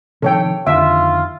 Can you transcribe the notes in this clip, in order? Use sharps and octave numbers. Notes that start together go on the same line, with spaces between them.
C3 D#3 F3 A4 C#5 G5
F2 D3 D#3 F4 E5